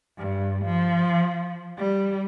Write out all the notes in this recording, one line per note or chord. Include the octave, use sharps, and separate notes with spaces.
G2
F3
G3